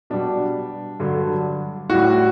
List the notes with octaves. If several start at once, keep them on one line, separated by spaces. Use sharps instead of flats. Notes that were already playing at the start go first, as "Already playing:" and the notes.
B2 G3 D4
G2 D3 F#3
A2 G3 F#4